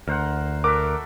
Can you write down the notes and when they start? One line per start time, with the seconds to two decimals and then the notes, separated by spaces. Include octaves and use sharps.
0.08 D2 A#4 C5 F#5
0.64 F#4 A4 A#4 E5 D6